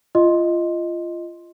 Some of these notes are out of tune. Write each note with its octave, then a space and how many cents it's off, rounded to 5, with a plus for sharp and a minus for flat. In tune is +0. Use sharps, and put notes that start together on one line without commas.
F4 -20 D#5 +0 C6 +10